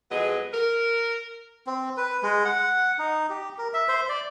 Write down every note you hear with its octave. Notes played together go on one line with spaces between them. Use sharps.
F2 F#3 G#3 B3 G#4 D#5
A#4
C4
B4
G#3
F#5
D#4
G4
A#4
E5
C5
D5